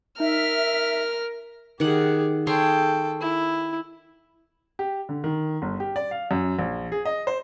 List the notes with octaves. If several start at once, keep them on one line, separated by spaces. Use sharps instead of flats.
D#4 A#4 E5 F6
D#3 G4 G#4 F#5
G#4 A4 C#5 G5 C6
E4
G4
D3
D#3
G1
G4
D5
F5
F#2
A#1
G#4
D#5
C5